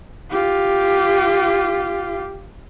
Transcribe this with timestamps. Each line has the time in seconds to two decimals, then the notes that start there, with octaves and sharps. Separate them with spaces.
0.31 F4 G4